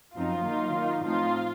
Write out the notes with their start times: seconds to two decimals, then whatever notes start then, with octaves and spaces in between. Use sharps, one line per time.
0.15 F#2 F3 C4 D#4 F4
0.44 D#3 F#3 A#3 D#4
0.74 D#3 A#3 D#4
1.04 A2 F3 C4 D#4 F4